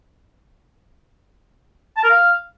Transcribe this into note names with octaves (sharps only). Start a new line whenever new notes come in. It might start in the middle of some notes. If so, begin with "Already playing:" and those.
A5
A#4
F5